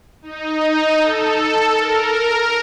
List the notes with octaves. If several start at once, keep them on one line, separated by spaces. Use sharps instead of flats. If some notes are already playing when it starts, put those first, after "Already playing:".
D#4
A4
A#4